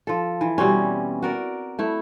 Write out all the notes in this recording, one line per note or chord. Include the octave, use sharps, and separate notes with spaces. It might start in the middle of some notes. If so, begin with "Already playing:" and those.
F3 A4
E3
B2 G3 C4 C#4
F#4 A#4 D5
A3 E4